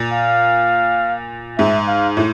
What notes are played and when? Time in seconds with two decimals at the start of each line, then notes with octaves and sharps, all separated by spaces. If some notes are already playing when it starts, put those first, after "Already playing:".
Already playing: A#2
0.13 F5
1.58 G#2 E5
1.88 F5
2.17 A2